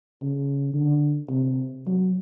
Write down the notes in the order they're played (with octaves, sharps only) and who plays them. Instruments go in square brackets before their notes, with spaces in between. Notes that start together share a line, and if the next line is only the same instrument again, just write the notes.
[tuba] C#3
D3
C3
F#3